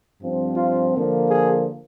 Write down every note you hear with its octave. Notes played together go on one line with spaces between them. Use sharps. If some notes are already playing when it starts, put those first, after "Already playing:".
G2 F3 C4
F4
D3 F3 A#3
G#4